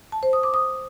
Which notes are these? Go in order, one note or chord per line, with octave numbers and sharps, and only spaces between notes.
A5
C5
D#6
D6
D#6